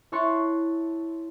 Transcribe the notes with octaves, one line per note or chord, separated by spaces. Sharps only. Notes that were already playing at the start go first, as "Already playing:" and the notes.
E4 C#5 A5 C6 F#6 C#7